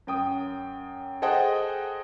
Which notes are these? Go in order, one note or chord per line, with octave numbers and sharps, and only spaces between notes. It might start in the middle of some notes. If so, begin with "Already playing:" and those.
F#2 G5 D#6
G#4 A4 C5 D#5 F#5 G5